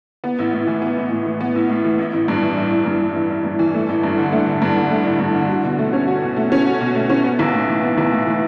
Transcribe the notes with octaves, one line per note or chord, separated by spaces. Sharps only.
B3
A1
A2
E3
B3
A1
A2
E3
B3
A1
A2
E3
A1
A1
G2
E3
A1
A1
G2
E3
A1
A1
G2
E3
A3
A1
G2
D3
A3
A1
G2
D3
A3
A1
G2
D3
F#4
B2
A3
C#4
F#4
B2
A3
C#4
F#4
B2
A3
C#4
B3
B1
A2
E3
B3
B1
A2
E3